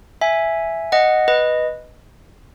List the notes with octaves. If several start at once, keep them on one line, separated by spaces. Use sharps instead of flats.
E5 G#5
D#5 F#5
B4 D#5